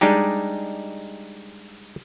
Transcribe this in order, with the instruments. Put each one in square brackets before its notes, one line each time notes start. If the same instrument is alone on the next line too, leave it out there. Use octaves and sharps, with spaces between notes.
[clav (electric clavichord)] G3 G#3 D4 D#4 G4